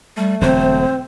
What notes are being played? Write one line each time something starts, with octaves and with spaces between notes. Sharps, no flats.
G3 A3
E1 D3 F#3 C4 C5